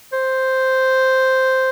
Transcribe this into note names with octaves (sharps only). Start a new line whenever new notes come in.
C5